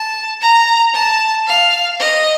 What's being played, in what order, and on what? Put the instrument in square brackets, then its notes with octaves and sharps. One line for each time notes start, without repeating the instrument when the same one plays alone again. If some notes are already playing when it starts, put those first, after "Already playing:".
Already playing: [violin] A5
A#5
A5
F5
D#5